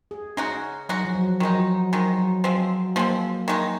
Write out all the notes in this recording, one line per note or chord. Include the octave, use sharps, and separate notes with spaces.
G#4
G#3 C#4 D#4 F#4
F#3 G#3 D#4 F#4
F3
F#3
D#3 F3 G#3 D#4
F#3
F3
D#3 F#3 G#3 D#4
F#3
F3 F#3 G#3 C4
F3 G#3 A#3 C4
D#3 G#3 D#4